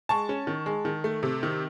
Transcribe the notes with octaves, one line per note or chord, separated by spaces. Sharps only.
G#3 A5 C#6
C#4
D#3
G#3
D#3
A3
C3
D#3